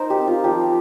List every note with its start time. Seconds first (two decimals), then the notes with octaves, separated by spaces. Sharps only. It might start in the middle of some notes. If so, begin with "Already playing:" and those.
Already playing: D#4 A#4 C5
0.10 G4
0.19 C4
0.28 F4
0.44 F3 G4